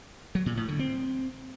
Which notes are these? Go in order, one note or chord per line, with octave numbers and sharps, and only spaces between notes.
F#3
A#2
A2
D3
C4